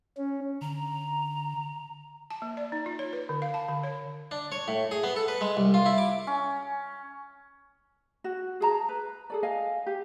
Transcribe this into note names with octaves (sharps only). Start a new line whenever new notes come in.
C#4
D3 A#5
A5
A#3
D5
D#4
F4
C#5
B4
D3
F5
A5
D3
C#5
D4
C#5
A2
G#4
B3
A4
B4
G#3
C2
F4
E4
D6
C#4
F#4
G#4 A4 A5 A#5
B4
G#4 A4 D5
D#5 F5 G#5
G4